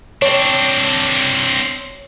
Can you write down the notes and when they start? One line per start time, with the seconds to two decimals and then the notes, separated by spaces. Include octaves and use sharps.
0.22 C4 D4 C#5